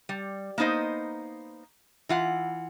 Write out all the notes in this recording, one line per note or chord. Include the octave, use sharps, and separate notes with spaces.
G3
A#3 B3 D#4 C5 D#5
E3 F4 F#5